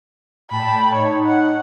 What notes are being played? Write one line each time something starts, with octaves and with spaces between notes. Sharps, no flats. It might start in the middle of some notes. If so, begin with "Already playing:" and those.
A2 G5 A5 B5
D#4 C#5
F#5